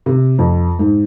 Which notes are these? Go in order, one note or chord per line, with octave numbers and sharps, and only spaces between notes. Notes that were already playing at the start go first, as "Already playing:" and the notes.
C3
F2
G#2